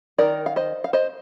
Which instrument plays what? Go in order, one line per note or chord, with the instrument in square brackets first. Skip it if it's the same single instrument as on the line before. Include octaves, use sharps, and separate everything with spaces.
[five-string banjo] D#3 A3 D#4 A#4 D5
F5
C5 D#5
F5
C5 D#5